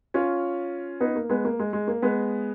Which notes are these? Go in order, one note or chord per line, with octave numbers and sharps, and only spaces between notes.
C#4 F4
B3 D#4
A#3
G#3 B3
A#3
G#3
G#3
A#3
G#3 B3